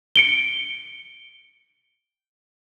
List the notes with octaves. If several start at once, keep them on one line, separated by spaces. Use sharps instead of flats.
C#7 D7 G7